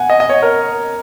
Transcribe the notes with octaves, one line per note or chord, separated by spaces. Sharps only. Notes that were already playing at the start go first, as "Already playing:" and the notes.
Already playing: F#5 G#5
D#5
D#5
C#5
A#4